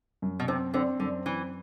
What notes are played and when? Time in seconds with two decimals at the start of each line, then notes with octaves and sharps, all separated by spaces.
0.22 F#2
0.40 B2
0.48 C3 C4
0.74 D3 C4
1.00 F#2 D3
1.26 E3 C4